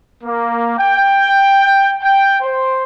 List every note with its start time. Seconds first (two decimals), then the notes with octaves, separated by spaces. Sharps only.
0.22 A#3
0.78 G5
2.01 G5
2.42 C5